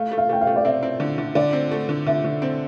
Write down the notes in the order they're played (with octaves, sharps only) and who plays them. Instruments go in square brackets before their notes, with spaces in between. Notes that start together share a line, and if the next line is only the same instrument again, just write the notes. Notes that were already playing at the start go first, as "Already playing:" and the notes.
Already playing: [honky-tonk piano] A3 [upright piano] F5
[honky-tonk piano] A3
[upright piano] F5
[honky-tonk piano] A3 [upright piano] G5
[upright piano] F5
[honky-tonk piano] A3
[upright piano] D5
[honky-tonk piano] C4 [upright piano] E5
[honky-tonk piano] C4
D3
D3
[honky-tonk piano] D3 [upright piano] D5
[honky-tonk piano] C4
A3
D3
[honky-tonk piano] D3 [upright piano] E5
[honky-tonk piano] D3
C4